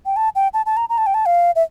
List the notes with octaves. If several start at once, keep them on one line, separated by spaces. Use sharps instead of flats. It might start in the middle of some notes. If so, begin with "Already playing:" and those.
G5
A5
G5
A5
A5
A#5
A#5
A5
G5
A5
F5
E5